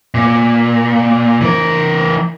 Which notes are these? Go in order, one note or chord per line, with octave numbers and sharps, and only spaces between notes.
A#2
E3 A#4